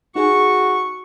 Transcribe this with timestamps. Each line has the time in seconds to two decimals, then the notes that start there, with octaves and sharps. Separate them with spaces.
0.16 D#4 F#4 G#4 G#5 C#6